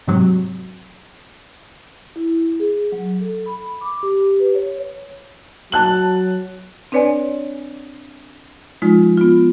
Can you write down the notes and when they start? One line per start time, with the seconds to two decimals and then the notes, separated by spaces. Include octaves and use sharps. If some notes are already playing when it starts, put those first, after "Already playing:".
0.07 G#2 C3 F#3
2.16 E4
2.60 G#4
2.92 F#3
3.21 A4
3.46 B5
3.81 D6
4.03 G4
4.40 B4
4.55 C#5
5.72 F#3 A5 F#6 F#7
6.92 C4 D4 B4 C#5 D5 G#5
8.82 F3 G#3 D#4 F4
9.17 B3 F4